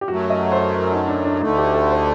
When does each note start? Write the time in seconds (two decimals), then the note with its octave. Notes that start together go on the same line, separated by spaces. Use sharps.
0.01 G4
0.08 F#2 F#3 A3 F#4
0.30 D#5
0.52 C5
0.74 A#4
0.91 D#4
1.08 D4
1.24 D4
1.41 D2 D3 A3 D#4
1.58 G4
1.74 A4
1.91 C5